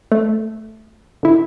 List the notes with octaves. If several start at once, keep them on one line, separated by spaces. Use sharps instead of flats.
A3
D3 E4